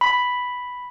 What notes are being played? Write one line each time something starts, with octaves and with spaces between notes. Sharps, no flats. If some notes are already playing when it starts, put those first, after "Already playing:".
B5